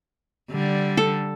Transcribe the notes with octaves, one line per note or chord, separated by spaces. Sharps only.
D3 G3
A4